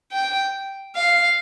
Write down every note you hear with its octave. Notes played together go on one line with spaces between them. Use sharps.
G5
F5